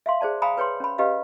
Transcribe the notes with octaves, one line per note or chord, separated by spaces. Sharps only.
E5 F5 C6
G#4 C5 D5 A5
F5 G5 G#5 A#5 B5 D#6
B4 C#5 G5 C6
C#4 B5
C#4 G4 B4 D#5 F5